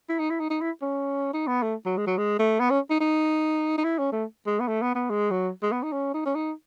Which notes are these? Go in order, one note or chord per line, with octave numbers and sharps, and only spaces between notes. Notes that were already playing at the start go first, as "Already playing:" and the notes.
E4
D#4
E4
D#4
D#4
E4
C#4
D#4
B3
A3
F#3
G#3
F#3
G#3
A3
B3
C#4
D#4
D#4
D#4
E4
C#4
A3
G#3
B3
A3
B3
B3
G#3
F#3
G#3
B3
D#4
C#4
D#4
C#4
D#4